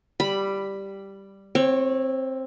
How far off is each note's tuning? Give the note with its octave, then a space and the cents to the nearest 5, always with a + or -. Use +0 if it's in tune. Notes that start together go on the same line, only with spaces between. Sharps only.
G3 +0 B5 +0
C4 +10 C#5 -20